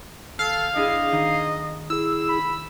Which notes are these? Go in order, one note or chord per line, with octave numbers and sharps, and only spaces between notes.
G#1 A4 F5
D4 E4 G#4 D#5
D#3 D#4
E4 G#4 E6
B5